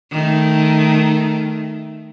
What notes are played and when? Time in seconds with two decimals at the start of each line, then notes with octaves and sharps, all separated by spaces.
0.12 D#3 A3